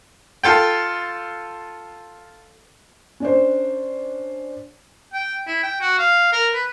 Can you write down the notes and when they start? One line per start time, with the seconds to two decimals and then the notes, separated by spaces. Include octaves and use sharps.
0.43 F4 A4 G5
3.20 C#4 D4 C5
5.13 G5
5.47 E4
5.63 G5
5.81 F#4
5.98 F5
6.33 A#4
6.54 B4